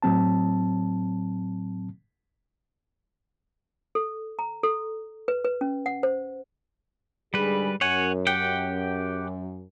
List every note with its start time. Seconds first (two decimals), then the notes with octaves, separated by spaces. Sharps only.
0.02 A2 F#3 C4 A5
3.95 A4
4.39 A#5
4.63 A4
5.28 B4
5.44 B4
5.61 C#4
5.86 F#5
6.03 C5
7.34 G#2 D3 G3 G#4 B4
7.81 F#2 C#5 F#5 G#5
8.27 G4 F#5 G5